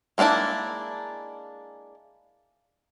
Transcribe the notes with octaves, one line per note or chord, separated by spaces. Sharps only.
G#3 A#3 C#4 D4 E4